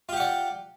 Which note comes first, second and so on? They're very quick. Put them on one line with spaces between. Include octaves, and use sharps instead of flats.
F4 G4 F#5 D5